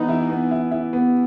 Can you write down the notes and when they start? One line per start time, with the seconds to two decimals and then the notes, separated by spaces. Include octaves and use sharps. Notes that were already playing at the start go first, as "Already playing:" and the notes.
Already playing: E3 B3 D#4 B4
0.09 E4
0.30 B3
0.51 E4
0.71 E4
0.93 B3